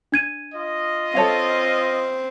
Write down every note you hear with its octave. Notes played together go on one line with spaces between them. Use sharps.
D4 G#6 D#7
F4 D#5
C4 A4 C#5 F5